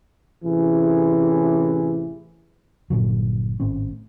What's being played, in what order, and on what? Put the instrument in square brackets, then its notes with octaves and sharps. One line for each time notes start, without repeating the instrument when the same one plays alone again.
[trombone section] A1 C3 E3 G#4
[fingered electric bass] G1 A#2 D3 F#3
G#1 A2 C4 C#4